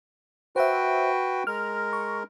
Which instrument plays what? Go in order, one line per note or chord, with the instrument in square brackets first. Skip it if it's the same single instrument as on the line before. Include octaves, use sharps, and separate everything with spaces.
[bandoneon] F#4 B4 G5 [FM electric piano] C5 E5
[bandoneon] G#3 A#4 [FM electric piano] F6
[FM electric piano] C#6